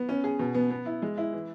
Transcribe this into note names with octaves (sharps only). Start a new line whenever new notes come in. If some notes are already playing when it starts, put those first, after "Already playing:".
Already playing: B3
C#4
G#4
B2
B3
B3
E4
G#3
E4
E3